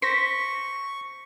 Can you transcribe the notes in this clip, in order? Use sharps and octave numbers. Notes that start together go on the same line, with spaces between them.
C5 C#6 A#6 B6